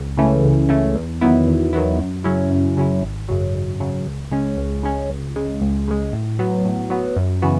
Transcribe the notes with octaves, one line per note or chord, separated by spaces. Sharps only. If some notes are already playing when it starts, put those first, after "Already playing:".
Already playing: C#2
C#3 E3 A3 C#4
C#2
C#3 E3 A3 C#4
E2
D#3 F#3 B3 E4
E2
D#3 F#3 B3 E4
F#2
C#3 F#3 C#4 E4
F#2
C#3 F#3 C#4 E4
G#1
F#2 C#3 F#3
G#1
F#2 C#3 F#3
C#2
C#3 G#3 C#4
C#2
C#3 G#3 C#4
C#2
C#3 G#3
C#2
C#3 G#3
A2
F#3 B3
A2
F#3 B3
F#2
C#3 E3 B3 F#4